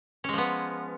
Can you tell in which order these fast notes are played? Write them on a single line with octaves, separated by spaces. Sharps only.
C#4 G#3 F3 B3